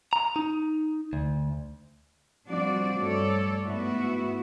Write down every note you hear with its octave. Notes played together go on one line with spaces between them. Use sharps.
A#5
D#4
D2
F3 G3 C4 D4 F#4 D5
G2 A3 A4 C#5 D5
G#2 A3 B3 E4 F#4